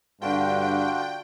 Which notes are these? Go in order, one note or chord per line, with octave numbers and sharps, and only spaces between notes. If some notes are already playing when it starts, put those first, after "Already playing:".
G2 D3 D4 F4 F#4 G5